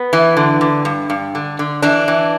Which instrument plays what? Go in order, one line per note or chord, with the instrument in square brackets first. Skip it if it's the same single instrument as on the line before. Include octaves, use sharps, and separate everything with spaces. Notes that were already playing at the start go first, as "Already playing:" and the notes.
Already playing: [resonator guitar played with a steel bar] B3
E3
D3
D3
G2
G2
D3
D3
E3 D4
E3